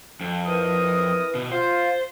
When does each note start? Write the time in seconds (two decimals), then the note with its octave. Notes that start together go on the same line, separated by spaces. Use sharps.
0.21 F2
0.46 E3 A#4 D#6
1.35 B2
1.52 F4 C5